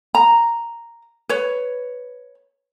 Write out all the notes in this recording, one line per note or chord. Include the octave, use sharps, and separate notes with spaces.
A#5
B4 C#5